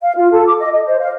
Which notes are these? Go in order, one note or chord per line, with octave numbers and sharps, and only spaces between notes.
F5
F4
A4
D6
D#5
D#5
C5
F5